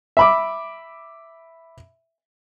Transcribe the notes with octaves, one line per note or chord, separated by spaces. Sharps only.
E5 B5 D6